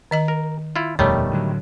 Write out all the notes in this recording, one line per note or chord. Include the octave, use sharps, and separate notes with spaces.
D#3 D#5 A#5
A#4
E4 F4
D#1 F2 B2 D#3 G3 A3 C#5
A2 D3 F#3